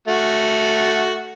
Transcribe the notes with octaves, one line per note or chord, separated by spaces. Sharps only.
A3 F#4